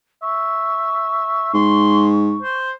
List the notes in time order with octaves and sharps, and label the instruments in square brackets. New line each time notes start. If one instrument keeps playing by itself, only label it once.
[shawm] E5 [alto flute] C#6
[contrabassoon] G#2 [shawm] C6
[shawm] C5